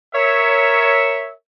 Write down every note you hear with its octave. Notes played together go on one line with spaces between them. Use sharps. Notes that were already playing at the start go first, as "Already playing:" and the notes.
A#4 C#5 E5